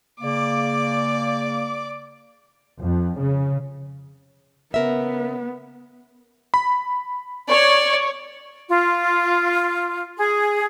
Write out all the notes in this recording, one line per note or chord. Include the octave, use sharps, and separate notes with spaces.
C#3 A#3 D5 D6
F2
C#3
C#3 B3 A#4 E5
B5
C#5 D5
F4
G#4